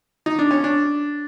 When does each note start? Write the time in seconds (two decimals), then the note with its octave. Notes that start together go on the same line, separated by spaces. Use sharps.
0.26 D#4
0.39 D4
0.51 C#4
0.64 D4